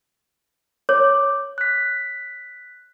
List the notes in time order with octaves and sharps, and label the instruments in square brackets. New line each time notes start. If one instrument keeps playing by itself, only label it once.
[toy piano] C#5 [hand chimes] D6
[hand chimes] F#6 B6